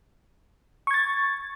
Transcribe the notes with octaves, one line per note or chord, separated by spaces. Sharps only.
C#6 G#6 A6